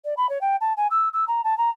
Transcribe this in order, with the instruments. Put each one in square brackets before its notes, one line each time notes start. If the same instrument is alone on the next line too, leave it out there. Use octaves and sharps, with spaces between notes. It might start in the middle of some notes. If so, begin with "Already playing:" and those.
[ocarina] D5
B5
C#5
G5
A5
G#5
E6
E6
A#5
A5
A#5